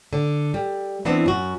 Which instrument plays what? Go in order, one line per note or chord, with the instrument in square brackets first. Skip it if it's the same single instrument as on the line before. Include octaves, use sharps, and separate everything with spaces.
[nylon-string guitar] D3
G3
E3 B3 C4 D4
F#2 F#4